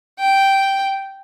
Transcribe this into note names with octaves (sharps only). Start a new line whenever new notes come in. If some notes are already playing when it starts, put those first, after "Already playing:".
G5